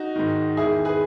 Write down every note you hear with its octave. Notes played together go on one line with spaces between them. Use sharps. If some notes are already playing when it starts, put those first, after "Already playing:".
Already playing: D#4 F#4
G#2 D#3
E2 D#3 E4 G#4
G#4 B4